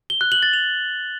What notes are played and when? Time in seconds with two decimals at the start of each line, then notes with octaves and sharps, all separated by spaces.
0.10 G7
0.21 F#6
0.32 F#7
0.43 A6
0.53 F7